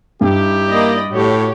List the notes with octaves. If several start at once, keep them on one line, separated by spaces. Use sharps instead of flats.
G2 D#4 E4 G4
A#3 D5 D#5 B5
A2 F#4 G4 C#5